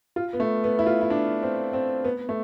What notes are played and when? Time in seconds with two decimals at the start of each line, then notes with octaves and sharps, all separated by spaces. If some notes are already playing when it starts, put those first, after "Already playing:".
0.16 F4
0.33 B3
0.40 A3
0.64 B3
0.79 E4
0.86 F4
1.01 E4
1.10 D4
1.43 C4
1.73 C4
2.04 B3
2.29 A3